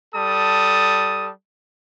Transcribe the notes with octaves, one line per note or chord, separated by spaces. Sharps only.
G3 A4 A5 D#6